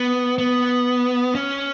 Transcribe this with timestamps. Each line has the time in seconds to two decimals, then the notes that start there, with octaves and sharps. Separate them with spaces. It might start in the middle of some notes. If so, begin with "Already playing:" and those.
Already playing: B3
0.38 B3
1.35 C#4